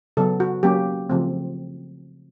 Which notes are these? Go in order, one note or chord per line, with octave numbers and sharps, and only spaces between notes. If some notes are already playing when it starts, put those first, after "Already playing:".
C#3 F#3 B3 A4
F#4
F#3 A#3 C#4 G4
C#3 F3 A3 C4